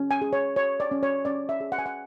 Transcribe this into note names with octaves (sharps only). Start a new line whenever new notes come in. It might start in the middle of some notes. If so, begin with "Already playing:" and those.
Already playing: C#4
G#5
G#4
C#5
C#5
D5
C#4
C#5
C#4 D5
E5
G#4
F#5
G#5
F#5